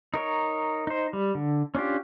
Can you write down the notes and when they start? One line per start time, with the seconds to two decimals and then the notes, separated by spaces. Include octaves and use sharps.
0.14 D#4 A#4 C#5
0.87 D#4 C5
1.13 G3
1.35 D3
1.75 C#4 D4 F4 G4